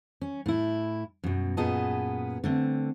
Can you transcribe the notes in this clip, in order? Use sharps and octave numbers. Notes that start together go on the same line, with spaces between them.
C#4
A2 E4
F#2 B2
F#2 A#2 B3 G#4 D#5 A5
D3 A3 C4